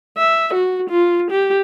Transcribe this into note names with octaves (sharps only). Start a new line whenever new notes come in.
E5
F#4
F4
G4